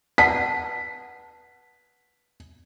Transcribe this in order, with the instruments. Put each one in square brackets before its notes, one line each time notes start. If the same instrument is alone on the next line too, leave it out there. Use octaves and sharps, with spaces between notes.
[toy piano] B4 F#5 A5 [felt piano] B6